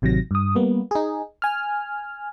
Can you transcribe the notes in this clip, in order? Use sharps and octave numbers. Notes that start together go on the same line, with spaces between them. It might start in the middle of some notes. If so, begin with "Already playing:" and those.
A1 C3 D#3 F#3 A#6
G2 D#6
G3 A#3 B3
D#4 G#4
G#5 F6